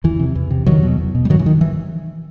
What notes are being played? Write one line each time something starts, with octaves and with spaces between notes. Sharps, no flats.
E2 E3
C3
E2
C3
E2 D#3 F#3
B2
E2
B2
G3
G2 D#3 F#3
E3
D#3
E3